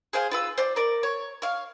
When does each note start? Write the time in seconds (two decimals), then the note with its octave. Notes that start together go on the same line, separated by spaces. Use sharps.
0.13 G#4 C5 F5 G#5
0.31 F4 B4 E6
0.58 C5 D5
0.76 A#4 D5
1.03 C#5
1.42 C#5 F5